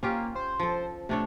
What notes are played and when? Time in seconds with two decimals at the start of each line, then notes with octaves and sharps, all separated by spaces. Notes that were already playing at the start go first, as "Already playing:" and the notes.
0.03 A#3 C#4 F4 G4
0.35 C5
0.60 F3 A4
1.09 C3 A3 D4 C#5